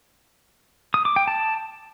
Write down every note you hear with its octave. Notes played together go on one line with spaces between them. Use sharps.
D#6
D6
G5
A5